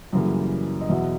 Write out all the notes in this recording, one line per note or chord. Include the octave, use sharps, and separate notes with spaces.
F#2 C#3 E3 G3 A#3
D#5
E2 B2 F#3 E5